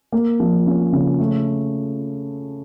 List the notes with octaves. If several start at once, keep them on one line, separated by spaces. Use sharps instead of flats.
A#3
F3
C#4
C#3
A3